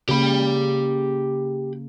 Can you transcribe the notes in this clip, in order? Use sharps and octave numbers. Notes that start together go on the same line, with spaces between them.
C#3 A#3 G4 B5